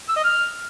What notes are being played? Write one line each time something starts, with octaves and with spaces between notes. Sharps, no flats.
E6
D#5
F6